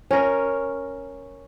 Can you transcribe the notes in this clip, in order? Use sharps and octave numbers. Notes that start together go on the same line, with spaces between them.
C#4 A#4